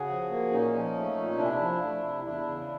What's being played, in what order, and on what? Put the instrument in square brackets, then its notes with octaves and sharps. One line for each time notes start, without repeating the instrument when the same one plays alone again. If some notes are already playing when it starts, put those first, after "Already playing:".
Already playing: [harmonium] C#3 F#4 G#4
F3
A#3
A#2 C#4 D#4
F3
A3
A#2
C3 D4 E4
F3
A3
C3
E2 D4 E4
C#3